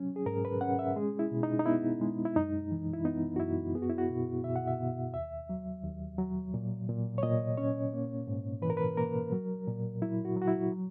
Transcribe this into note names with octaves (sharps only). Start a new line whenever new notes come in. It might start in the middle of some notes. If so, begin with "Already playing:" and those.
Already playing: F#3 C#4
G#4
G#2 A#4
B4
C#4 F#5
E5
G#3 G#4
E4
B2
D#4
D#4
B3 E4
G#3
E4
F#2 D#4
E3
E4
B3 D#4
F#4
F#2 E4
B3 G#4
F#4
E4
F#4
B2
B2 E5
F#5
E5
B2
D#2 E5
F#3
D#2
F#3
A#2
A#2
C#5
A#2 D#5
C#4 C#5
A#3
G#2
E3 B4
A#4
B4
A#3 A#4
F#3
A#2
F#3 E4
F#4
F#3
F#4
E4
F#3